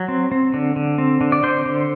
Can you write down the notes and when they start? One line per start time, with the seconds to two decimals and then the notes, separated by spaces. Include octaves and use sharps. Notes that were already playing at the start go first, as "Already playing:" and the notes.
Already playing: F#3
0.08 C4
0.32 C4
0.54 D3
0.76 D3
0.98 C4
1.21 D3
1.32 D5
1.43 D3 C5
1.66 D3